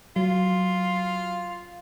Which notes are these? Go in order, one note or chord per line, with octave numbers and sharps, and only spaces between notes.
F#3 F4